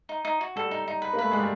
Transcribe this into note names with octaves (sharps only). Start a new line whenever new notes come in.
D#4
D#4
F#4
G3 A4
D#4
D#4
B4
A#3
A3 B4
G#3 D5
G3